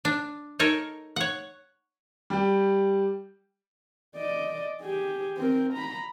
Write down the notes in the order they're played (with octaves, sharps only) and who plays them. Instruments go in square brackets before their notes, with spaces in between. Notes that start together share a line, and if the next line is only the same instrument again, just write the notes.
[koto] D4
D#4 A4 A#4 C#5
C#5 F#5
[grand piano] G3 G4
[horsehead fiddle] D5 D#5
G4 G#4
C4 A#4
A#5 B5